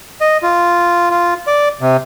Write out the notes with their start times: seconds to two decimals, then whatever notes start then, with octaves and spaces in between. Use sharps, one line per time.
0.21 D#5
0.43 F4
1.11 F4
1.47 D5
1.81 C3